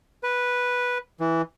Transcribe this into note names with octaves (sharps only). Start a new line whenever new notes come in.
B4
E3